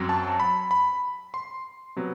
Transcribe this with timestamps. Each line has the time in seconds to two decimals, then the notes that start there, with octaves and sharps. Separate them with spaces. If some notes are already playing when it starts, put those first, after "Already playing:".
Already playing: F#2 F#3 C4
0.09 A5
0.40 B5
0.71 B5
1.34 C6
1.96 C3 F#3 B3